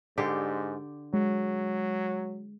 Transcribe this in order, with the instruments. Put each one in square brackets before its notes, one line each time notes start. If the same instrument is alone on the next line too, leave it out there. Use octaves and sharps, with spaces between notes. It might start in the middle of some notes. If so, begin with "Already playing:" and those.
[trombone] G#2 [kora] D3 G4
[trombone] F#3 [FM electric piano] G#3